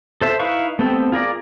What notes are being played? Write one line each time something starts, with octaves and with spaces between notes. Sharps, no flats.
A4 C5 E5
D#4 E4 B4 F5 C#6
A3 B3 C4 G4 A4
F4 G#4 A#4 D5